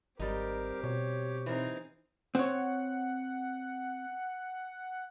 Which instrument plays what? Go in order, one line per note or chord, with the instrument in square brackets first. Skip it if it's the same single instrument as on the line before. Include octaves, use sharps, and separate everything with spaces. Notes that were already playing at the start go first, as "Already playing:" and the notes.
[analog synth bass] G#1 [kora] G3 D#4 [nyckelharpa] C4 G4 [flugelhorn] A#4
[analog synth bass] B2 [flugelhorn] C#5
[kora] E3 A#4 [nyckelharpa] C4 D#4
[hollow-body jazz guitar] C4 C#5 [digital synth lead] F#5